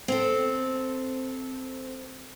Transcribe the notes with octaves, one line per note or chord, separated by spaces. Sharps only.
C4 A4